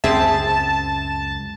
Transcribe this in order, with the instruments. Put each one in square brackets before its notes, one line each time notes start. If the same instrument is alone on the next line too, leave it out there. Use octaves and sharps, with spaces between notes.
[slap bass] C#2 F#2 [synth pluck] C4 G#4 E5 [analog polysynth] A5